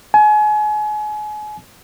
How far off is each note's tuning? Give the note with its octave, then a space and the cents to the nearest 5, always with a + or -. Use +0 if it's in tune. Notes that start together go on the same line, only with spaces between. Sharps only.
G#5 +30